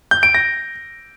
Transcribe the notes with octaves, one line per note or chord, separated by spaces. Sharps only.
G6
D7
A#6